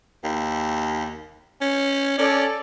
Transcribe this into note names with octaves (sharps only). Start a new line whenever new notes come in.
D#2
C#4
C#4 A4 D5